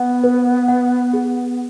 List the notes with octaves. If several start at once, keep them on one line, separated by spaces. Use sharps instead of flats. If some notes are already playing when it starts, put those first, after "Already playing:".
Already playing: B3 F#5
B4
F#5
G#4